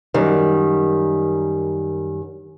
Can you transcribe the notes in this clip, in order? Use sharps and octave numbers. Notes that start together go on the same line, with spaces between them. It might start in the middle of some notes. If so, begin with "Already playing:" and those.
F#2 D#3 G3